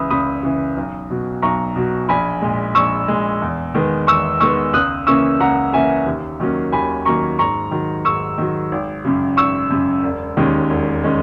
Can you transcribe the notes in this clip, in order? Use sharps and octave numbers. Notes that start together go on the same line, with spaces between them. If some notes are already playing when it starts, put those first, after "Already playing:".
Already playing: C#2 C#3 E3 B5 D#6 E6
C#2 B5 D#6
C#3 E3
B1
B2 F#3
B1 A#5 C#6
B2 F#3
A#1 G#5 B5
A#2 G#3
A#1 C#6 E6
A#2 G#3
E2
D#3 G#3 B3
E2 C#6 E6
D#3 G#3 B3 C#6 E6
C#2 D#6 F#6
C#3 E3 A#3 C#4 C#6 E6
C#2 F#5 A#5
C#3 E3 A#3 C#4 E5 G#5
D#2
D#3 F#3 A#3 C#4
D#2 G#5 B5
D#3 F#3 A#3 C#4 A#5 C#6
G#2 A#5 C#6
D#3 F#3
G#2 C#6 E6
D#3 F#3
G#1
F#2 C#3
G#1 C#6 E6
F#2 C#3
E1
D#2 D#3 G#3 C#4
E1
D#3 G#3 C#4